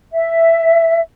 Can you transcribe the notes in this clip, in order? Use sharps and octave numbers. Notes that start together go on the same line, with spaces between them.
E5